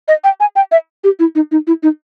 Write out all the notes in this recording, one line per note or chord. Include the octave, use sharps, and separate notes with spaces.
D#5
G5
G#5
G5
E5
G4
E4
D#4
D#4
E4
D#4